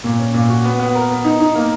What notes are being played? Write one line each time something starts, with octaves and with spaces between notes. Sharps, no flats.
A#2
C#4
A#2
F#4
B3
B3
A#4
B3
D#4
D#4
A#3